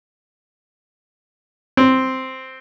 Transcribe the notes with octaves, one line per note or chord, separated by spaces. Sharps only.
C4